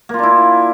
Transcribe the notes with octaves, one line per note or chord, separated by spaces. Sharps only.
A#3 D4 E4 F4